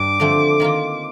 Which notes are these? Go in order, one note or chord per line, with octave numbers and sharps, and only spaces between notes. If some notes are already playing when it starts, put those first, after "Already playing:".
Already playing: G2 G3 D4 D6
D3 F3 A3 C4
D#3 A#3 F4